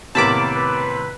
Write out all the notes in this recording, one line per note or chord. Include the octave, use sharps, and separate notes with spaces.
A2 C3 D#3 A#3 B3 A5 B5 D6
B4